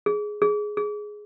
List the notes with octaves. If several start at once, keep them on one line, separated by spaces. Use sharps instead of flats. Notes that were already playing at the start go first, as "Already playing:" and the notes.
G#4
G#4
G#4